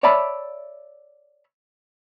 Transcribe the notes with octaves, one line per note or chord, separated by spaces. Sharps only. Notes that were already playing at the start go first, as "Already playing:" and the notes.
C#5 D5 E5 A5 B5